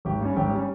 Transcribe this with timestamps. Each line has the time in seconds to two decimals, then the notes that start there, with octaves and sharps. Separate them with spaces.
0.05 G#1 G4
0.21 G2 G3 C#4
0.36 G#1 G4
0.54 G3 C#4